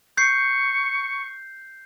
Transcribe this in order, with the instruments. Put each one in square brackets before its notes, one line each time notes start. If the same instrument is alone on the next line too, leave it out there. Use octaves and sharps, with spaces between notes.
[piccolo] C#6 [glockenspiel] G6 C7